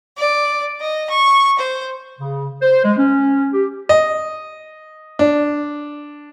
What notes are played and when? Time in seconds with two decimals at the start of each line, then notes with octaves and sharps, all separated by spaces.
0.17 D5
0.80 D#5
1.08 C#6
1.57 C5
2.19 C#3
2.62 C5
2.84 G#3
2.97 C#4
3.53 G4
3.89 D#5
5.19 D4